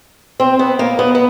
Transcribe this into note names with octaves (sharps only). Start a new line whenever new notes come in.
C4
B3
A#3
B3
B3